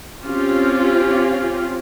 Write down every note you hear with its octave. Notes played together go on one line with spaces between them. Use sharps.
C4 C#4 F4 G4